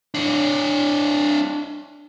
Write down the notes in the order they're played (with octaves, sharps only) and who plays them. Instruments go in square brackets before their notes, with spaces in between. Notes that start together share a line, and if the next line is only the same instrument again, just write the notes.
[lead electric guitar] D4 C#5